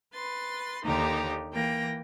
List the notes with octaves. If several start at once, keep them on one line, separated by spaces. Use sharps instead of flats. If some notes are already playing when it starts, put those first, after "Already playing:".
B4 C6 A6
D#2 D3 D#4 G4 A#4
E3 A#3 G5 A#6